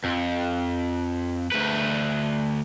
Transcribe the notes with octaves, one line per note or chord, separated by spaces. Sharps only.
F2
D2 B4